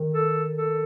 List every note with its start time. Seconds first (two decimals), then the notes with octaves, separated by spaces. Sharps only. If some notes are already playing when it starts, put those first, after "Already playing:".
Already playing: D#3
0.13 A4
0.58 A4